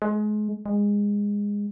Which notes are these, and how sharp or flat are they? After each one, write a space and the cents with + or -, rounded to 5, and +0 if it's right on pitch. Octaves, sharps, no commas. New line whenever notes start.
G#3 +30
G#3 -20